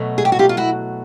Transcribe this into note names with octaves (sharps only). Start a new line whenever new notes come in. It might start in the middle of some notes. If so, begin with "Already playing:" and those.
Already playing: B2 F#3 A3
G#4
G4
F#4
F4 G4
F4
E4 F#4